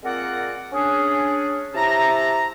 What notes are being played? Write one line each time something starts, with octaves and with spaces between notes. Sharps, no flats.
A#2 G#3 C4 A#4 D5 F#5
C#4 D4 G#4
C3 E4 A5 A#5